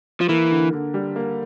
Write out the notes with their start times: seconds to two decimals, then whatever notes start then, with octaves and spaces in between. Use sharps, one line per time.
0.21 F3
0.29 E3 A#3
0.51 D3
0.73 D3
0.94 G3
1.16 A#3